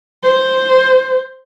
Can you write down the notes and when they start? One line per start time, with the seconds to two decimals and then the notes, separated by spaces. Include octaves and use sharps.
0.23 C5